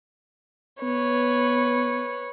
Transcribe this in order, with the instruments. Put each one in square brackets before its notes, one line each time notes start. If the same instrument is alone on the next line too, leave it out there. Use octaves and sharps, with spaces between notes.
[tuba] B3 [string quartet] B4 C#5